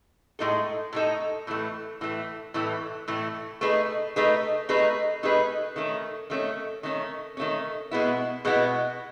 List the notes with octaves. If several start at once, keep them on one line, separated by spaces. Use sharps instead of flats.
A2 G#3 D#4 A4
A2 G#3 D#4 A4
A2 E3 A3
A2 E3 A3
A2 E3 A3
A2 E3 A3
A3 D#4 G#4 B4
A3 D#4 G#4 B4
A3 D#4 G#4 B4
A3 D#4 G#4 B4
D#3 A3 C#4
D#3 A3 C#4
D#3 A3 C#4
D#3 A3 C#4
B2 G#3 B3 E4
B2 G#3 B3 E4